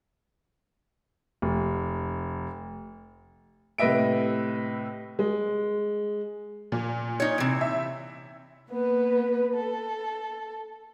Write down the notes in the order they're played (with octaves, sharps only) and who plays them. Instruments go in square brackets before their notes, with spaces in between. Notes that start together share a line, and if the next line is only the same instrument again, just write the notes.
[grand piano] F1
A2 C3 B4 D#5 E5 D7
G#3
[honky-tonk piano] A#2
[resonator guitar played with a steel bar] D#4 C#5
C3 E3
[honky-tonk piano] E5
[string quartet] A#3 B3 B4
A4